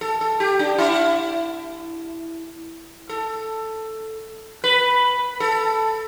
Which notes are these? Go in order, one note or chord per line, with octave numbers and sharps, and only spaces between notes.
A4
A4
G4
D4
E4
A4
B4
A4